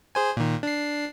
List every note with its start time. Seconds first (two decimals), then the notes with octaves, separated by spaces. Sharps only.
0.15 G#4 C5 G#5
0.37 A#2 D#3
0.63 D4 C7